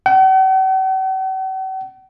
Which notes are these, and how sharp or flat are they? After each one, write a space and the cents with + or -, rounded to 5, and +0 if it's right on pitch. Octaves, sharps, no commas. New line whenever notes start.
F#5 +45